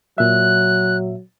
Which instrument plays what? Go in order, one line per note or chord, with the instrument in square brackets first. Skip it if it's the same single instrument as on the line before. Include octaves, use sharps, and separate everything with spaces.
[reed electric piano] A#2 E5 [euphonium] F#3 [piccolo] F#6